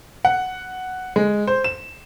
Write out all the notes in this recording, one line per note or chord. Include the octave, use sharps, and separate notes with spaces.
F#5
G#3
C5
E7